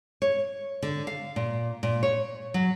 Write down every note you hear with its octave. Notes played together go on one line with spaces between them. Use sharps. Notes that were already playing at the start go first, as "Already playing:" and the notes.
C#5
D3
F5
A#2
A#2
C#5
F#3